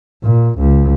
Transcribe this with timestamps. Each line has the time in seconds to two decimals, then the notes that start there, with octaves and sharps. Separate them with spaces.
0.23 A#2
0.59 C#2